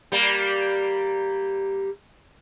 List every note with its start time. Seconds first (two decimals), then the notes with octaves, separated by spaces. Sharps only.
0.12 G3 A#3